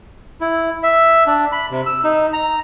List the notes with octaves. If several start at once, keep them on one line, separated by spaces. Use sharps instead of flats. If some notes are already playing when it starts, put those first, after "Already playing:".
E4
E5
D4
B5
C3
E6
D#4
A#5